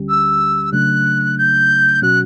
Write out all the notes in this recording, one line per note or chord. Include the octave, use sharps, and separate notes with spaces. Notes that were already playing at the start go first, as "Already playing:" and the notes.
Already playing: D2 D3 G3 C#4 G4
E6
C#3 F#3 A3 D4 F#6
G6
B2 F#3 C#4 F#4 F#6